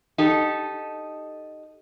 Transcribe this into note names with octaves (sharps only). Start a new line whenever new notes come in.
D#4 G4 A4